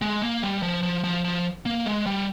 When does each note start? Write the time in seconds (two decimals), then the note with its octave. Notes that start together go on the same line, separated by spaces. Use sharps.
0.02 G#3
0.22 A#3
0.42 G3
0.63 F3
0.83 F3
1.04 F3
1.24 F3
1.66 A#3
1.86 G#3
2.06 G3